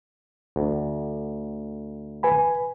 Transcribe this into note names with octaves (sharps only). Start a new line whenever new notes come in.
D2
B4 G#5 B5